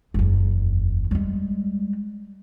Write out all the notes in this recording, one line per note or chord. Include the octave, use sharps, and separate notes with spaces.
F#1 E2
G3 G#3